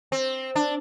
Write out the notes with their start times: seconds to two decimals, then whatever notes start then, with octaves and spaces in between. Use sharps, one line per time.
0.12 C4
0.55 D4